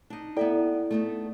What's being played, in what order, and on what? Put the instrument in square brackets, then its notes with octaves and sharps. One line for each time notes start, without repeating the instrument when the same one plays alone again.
[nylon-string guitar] D4 D#4
[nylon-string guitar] B3 E5 G5 [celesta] E4 A4 D5
[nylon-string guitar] A3 B3 D#4